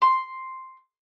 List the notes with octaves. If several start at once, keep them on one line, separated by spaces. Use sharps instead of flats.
C6